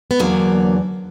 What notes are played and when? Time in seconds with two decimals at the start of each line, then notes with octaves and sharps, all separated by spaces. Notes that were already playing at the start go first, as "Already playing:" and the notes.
0.11 B3
0.19 E2 D3 F#3 A#3